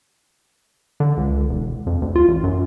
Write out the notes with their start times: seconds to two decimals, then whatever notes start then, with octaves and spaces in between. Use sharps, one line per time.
1.00 D3
1.17 C#2
1.49 E1
1.87 F2
2.02 D2
2.16 F4
2.28 A1
2.44 F#2